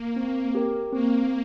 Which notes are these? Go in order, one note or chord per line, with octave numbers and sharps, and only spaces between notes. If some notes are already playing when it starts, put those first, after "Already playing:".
Already playing: A#3
C4
G4 A#4
A#3 C4